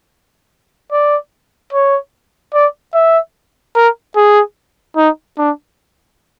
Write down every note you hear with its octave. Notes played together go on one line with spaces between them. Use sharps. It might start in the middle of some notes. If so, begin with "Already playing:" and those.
D5
C#5
D5
E5
A#4
G#4
D#4
D4